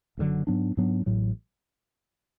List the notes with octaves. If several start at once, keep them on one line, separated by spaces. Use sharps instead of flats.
F#1 E2 D3 F#3
G#2 F#3 B3 D4
G#2 F#3 B3 D4
A1 A2 F#3